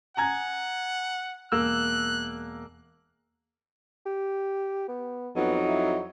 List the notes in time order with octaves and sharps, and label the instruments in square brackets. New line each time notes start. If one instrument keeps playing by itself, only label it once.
[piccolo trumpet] F#5 [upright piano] G#5 A#5 G#6
[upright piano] E1 A#3 E6 [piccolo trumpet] F#6
[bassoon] G4
B3
[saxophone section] F2 F#3 D#4 [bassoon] B3
[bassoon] E4